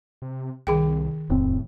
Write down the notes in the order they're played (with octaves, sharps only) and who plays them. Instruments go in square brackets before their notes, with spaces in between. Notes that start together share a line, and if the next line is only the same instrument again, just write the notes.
[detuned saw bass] C3
[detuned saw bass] C2 [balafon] D#3 G#4 G5
[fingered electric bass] D#1 F2 C4 [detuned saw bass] A2